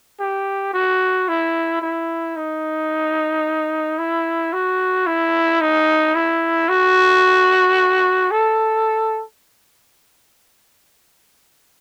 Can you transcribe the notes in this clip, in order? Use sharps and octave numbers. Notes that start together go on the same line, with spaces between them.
G4
F#4
E4
E4
D#4
E4
F#4
E4
D#4
E4
F#4
A4